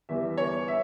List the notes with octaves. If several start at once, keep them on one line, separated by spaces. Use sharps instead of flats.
E2 E3 G3 E5
C#5
E5